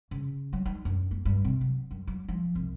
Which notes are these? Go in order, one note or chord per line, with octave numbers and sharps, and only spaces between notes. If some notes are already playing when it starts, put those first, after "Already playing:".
C#3
F#3
D#4
F#2
A#3
G2
C3
F#3
F#2
F#3
F3
C2